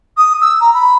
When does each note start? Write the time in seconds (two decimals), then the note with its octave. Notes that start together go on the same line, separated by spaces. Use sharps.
0.17 D#6
0.41 E6
0.60 A#5
0.74 B5